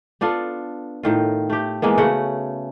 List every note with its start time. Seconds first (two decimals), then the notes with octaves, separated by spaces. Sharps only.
0.21 B3 D4 F4 A4
1.03 A2 D#3 F4
1.50 A3 G4
1.82 E3 G#3 A#3 B3
1.98 C#3 A3 F#4 F#5